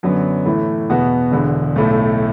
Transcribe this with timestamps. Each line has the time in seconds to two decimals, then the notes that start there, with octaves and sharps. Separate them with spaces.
0.03 F#2 D3 F#3 B3
0.46 A2 E3 A3
0.90 E2 B2 B3 F#4
1.31 E1 E2 D3
1.76 B1 A2 A3